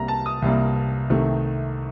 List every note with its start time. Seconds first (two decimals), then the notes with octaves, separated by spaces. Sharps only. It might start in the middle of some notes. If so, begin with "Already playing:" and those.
Already playing: C2 C3 G3 A#3 A#5
0.08 A5
0.26 D#6
0.42 C2 C3 G3 A#3
1.10 C2 C3 D#3 A3